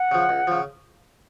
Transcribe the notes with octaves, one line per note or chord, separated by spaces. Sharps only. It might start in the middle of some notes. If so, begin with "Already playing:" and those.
Already playing: F#5
C#3 F3
C#2
C#3 F3